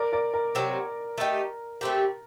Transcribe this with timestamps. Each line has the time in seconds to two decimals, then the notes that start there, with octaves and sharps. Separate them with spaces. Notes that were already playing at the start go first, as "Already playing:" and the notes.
Already playing: A#4 D5
0.12 A#4 D5
0.34 A#4
0.55 C3 F#3 C4
1.18 A3 D#4 G4
1.81 A3 C4 G4 A#4